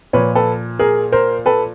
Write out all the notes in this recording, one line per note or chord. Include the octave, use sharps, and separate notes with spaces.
A#2 F3 B4 C#5
A4 B4
G#4 A#4
A#4 C5
A4 B4